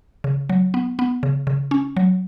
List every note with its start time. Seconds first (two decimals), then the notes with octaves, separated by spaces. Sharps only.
0.24 C#3
0.49 F#3
0.74 B3
0.99 B3
1.23 C#3
1.47 C#3
1.71 C#4
1.97 F#3